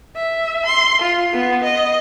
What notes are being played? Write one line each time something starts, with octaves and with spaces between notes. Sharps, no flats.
E5
C6
F4
B3
D#5